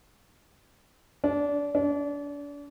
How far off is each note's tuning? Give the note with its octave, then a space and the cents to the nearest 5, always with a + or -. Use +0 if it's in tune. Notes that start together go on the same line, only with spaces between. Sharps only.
D4 -25
D4 -35